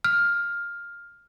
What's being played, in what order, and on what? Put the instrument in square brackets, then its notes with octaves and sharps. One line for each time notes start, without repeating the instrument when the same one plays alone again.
[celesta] F6